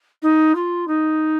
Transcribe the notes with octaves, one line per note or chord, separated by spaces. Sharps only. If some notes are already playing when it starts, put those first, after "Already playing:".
D#4
F4
D#4